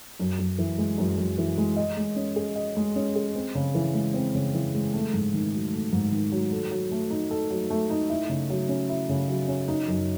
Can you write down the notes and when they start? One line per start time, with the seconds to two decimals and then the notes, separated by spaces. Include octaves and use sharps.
0.20 F#2
0.39 F#2
0.58 E3
0.78 G#3
0.98 F#2
1.18 F#2
1.38 E3
1.58 G#3
1.77 D#5
1.97 G#3
2.16 C#4
2.36 G#4
2.56 D#5
2.77 G#3
2.96 C#4
3.16 G#4
3.35 C4
3.55 C#3
3.75 E3
3.94 G#3
4.14 C4
4.35 C#3
4.54 E3
4.74 G#3
4.94 A3
5.13 G#2
5.33 D#3
5.53 F#3
5.73 A3
5.93 G#2
6.11 D#3
6.32 F#3
6.52 A4
6.71 F#3
6.92 A3
7.10 D#4
7.31 A4
7.50 F#3
7.70 A3
7.90 D#4
8.09 E4
8.29 C#3
8.50 F#3
8.69 C#4
8.89 E4
9.09 C#3
9.29 F#3
9.48 C#4
9.68 D#4
9.88 F#2